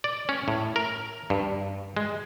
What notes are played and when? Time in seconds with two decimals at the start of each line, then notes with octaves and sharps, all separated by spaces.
0.04 D5
0.29 C#4
0.48 A2
0.76 A#4
1.30 G2
1.97 G#3